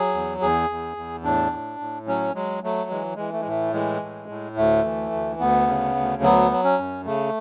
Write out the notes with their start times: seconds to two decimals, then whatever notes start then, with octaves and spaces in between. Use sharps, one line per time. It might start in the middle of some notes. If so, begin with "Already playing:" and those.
Already playing: F#3 G#4
0.14 E2
0.41 E2 G#4
0.70 E2
0.97 E2
1.24 A2 D4
1.52 A2
1.80 A2
2.07 F#3 C#4
2.35 F#3 G#3
2.63 F#3 A3
2.90 E3 G#3
3.15 E3 G#3
3.33 A3
3.40 G#3
3.46 A2 A3
3.73 E3 G#3
4.02 A2
4.29 A2
4.57 D2 A3
4.84 E3
5.12 D2
5.39 D2 B3
5.67 C#3
5.95 D2
6.22 F#3 B3
6.51 F#3
6.64 C#4
6.79 F#2
7.06 C#3 A3